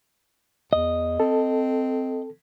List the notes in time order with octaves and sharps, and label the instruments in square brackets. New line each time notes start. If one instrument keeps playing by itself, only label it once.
[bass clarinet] E2 [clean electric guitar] D#5
[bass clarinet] C4 [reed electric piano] A4